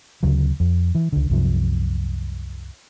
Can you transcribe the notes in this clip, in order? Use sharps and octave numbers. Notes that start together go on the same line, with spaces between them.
D2 C#3 F#3
F2
E3
C#2 D3
C2 F#2 C3 F3